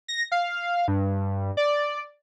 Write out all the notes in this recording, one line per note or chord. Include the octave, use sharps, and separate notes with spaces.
A#6
F5
G2
D5